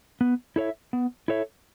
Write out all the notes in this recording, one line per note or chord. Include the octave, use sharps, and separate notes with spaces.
B3
E4 A4 C#5 E5
B3
E4 A4 C#5 E5